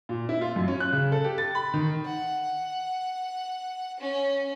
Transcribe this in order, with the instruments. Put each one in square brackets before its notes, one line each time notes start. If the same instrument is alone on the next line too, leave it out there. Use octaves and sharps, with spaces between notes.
[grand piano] A#2
E4
F4
F#2
C#4
F#6
C#3
A4
G4
A6
B5
D#3
[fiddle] F#5
C#4